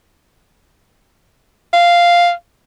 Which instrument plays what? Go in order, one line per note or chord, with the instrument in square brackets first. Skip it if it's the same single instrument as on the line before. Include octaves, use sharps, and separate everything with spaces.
[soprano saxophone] F5